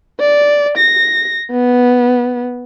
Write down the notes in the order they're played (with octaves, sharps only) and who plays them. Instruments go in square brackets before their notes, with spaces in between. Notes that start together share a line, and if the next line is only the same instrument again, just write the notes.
[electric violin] D5
A#6
B3